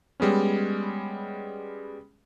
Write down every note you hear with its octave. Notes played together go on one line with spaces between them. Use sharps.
G3 G#3 B3 C#4